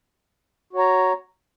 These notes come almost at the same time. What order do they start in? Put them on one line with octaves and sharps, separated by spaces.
F#4 C#5 A#5